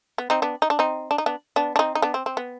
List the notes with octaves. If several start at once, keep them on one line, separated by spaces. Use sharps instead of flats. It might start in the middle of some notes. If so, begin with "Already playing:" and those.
B3
C4 D#4
B3 D4
D#4
D4
C4 D#4
D4
D#4
B3 D4
B3 D4
D4
C4 D#4
D#4
B3 D4
C4
C4
B3